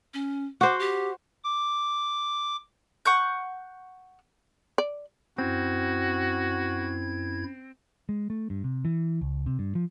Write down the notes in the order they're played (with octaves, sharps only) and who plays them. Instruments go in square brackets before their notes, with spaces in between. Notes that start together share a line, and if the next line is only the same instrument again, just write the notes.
[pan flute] C#4
[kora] F#4 C5 [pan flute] D6
[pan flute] G4
[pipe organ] D6
[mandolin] F#5 C#6 G6
[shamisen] D5
[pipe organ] F#2 E4 G#6 [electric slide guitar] C4 [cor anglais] F#4
[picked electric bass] G#3
A3
G2
C3
E3
C#2
C3
G2
F3